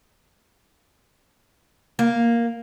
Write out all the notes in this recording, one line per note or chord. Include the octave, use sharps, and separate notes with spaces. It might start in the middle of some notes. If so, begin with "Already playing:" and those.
A#3